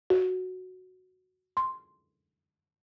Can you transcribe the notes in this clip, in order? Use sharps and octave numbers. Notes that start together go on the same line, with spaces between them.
F#4
C6